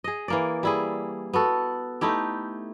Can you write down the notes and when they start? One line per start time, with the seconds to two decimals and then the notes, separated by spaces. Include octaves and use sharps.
0.04 G#4 D#5
0.28 E3 A#3 D5
0.63 G3 E4 G#4
1.33 B3 F#4 A4
2.01 A3 D#4 E4 G4